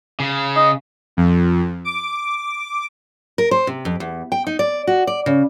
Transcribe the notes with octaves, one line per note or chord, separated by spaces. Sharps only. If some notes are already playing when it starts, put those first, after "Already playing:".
C#3
D#5
F2
D6
A#4
C5
C3
F2
E2
G5
D#4
D5
F#4
D5
C#3